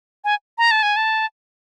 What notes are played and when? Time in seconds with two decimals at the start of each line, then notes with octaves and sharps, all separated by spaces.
0.24 G#5
0.58 A#5
0.71 A5
0.83 G#5
0.96 A5